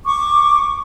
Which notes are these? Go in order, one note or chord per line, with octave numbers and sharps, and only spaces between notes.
C#6 D6